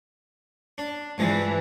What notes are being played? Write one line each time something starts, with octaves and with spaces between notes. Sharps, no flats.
D4
G2 E3 F3 G#3